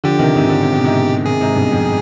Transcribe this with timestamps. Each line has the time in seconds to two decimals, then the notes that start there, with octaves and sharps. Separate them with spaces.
0.04 D3 F3 G4
0.19 C3 D#3
0.35 G#2 C3
0.49 D3
0.61 C3
0.73 B2
0.84 G#2 C3
1.26 C3 D#3 G#4
1.41 G#2 C3
1.56 G2 B2
1.72 F2